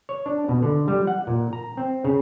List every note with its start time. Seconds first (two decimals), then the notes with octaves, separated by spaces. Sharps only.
0.09 C#5
0.26 D4
0.49 B2
0.62 D3
0.88 G3
1.07 F#5
1.27 A#2
1.53 A#5
1.77 C4
2.05 C#3